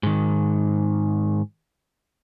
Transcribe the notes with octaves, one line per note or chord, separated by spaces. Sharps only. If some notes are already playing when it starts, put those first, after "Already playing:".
G#2 D#3